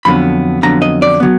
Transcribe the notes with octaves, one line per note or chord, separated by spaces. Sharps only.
F2 D3 F#3 B3 B5
F2 D3 F#3 B3 A#5
D#5
D5
D3 F#3 B3